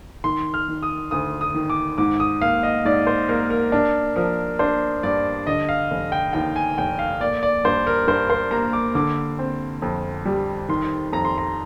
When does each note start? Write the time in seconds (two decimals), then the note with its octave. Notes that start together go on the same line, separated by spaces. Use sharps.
0.24 D#3 C6
0.54 F6
0.68 D#3
0.83 D#6
1.11 D2 D#6
1.41 D#6
1.54 D#3
1.70 D6
1.98 G#2 D6
2.20 D#6
2.41 A#3 F5
2.63 D#5
2.85 G#2 D5
3.07 C5
3.29 A#3 A#4
3.50 A#4
3.72 D4 A#4
4.16 F3 A#4
4.59 D4 C5
5.03 G2 D5
5.47 D3 D#5
5.69 F5
5.91 F1
6.12 G5
6.33 D#2 G5
6.56 G#5
6.78 F1 G5
6.99 F5
7.20 A#3 D5
7.43 D5
7.65 G2 C5
7.87 A#4
8.07 G2 C5
8.30 C5
8.51 A#3 A#5
8.73 D6
8.95 D3 D6
9.39 C4
9.82 F2
10.26 G3
10.69 D#3 C6
11.12 F2 A#5
11.25 C6
11.38 A#5